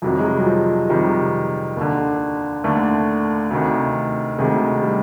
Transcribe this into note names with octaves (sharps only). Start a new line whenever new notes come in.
F2 C3 D#3 F#3
G#3
G3
F#3
F3
F2 C3 D#3 G3
D#2 D3
D#2 D3 A3
D2 C3 D#3
D2 C3 D#3 G#3
G3